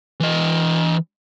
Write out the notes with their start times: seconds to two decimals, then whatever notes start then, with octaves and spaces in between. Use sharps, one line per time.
0.20 E3 D#5